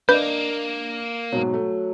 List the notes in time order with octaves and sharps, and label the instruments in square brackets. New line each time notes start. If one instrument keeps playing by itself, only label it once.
[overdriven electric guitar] A#3 [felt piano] D4 D5 D#5 [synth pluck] B4 G6
[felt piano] G#2 B2 [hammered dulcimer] F#3
[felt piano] A3